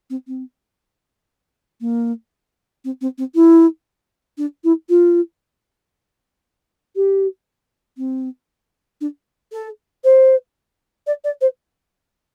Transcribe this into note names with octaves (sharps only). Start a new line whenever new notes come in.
C4
C4
A#3
C4
C4
C4
E4
D4
E4
F4
G4
C4
D4
A4
C5
D5
D5
C5